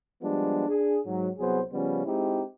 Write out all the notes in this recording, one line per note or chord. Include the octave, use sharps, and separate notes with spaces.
F3 G3 G#3 B3 D4
D4 G#4
G#2 F#3
C2 F#3 B3 G#4 C5
C#3 F3 G3 B3 C#4
G#3 C4 D#4 E4 G4